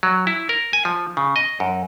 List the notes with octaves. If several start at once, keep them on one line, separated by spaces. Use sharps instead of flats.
F#3
E4
A#4
G#5
F3
C#3
D#5
F#2